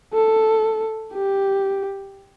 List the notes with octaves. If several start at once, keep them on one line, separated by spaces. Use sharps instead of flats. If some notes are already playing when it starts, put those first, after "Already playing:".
A4
G4